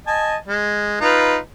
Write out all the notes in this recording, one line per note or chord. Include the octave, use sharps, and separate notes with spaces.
D#5 G#5 A5
G#3
D#4 F4 B4